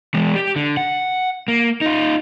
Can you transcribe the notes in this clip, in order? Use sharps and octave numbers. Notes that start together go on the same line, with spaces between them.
E3 G#3
G4
D3
F#5
A#3
D#4 F4